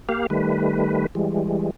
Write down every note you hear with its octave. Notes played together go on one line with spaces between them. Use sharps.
A#3 G4 F5
D#3 G3 A3 B4
E3 G3 G#3